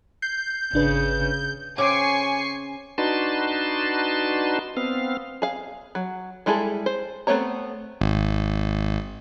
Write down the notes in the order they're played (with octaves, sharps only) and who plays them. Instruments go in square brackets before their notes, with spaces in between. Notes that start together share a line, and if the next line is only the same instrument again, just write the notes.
[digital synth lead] G6 [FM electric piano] C7
[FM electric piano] G#1 D4 B4 [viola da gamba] C#3
[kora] C#3 C4 [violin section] G#5 C#6 C7 [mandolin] D6
[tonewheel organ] D4 D#4 F#4 B4 A5 C6
B3 C4 F5
[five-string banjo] G#4 F5
F#3
G3 G#3 E4 G#4 A4
C5
A3 B3 C4 C#5 A#5
[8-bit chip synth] G#1